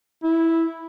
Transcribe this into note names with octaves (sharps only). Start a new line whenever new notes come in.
E4